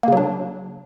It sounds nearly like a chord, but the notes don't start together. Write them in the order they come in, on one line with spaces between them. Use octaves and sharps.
A#3 C#3 F#3 D4